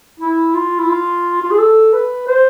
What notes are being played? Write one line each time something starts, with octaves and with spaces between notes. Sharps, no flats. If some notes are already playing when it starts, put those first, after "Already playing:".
E4
F4
E4
F4
F4
G#4
A4
B4
C5